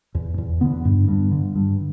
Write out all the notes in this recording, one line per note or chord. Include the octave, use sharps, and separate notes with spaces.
E2
E2
D3 B3
G2
G2
D3
G2